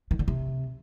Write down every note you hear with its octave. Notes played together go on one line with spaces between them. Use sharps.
D#3
D3
C3